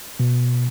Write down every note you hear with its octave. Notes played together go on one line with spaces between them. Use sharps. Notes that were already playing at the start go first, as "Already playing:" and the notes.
B2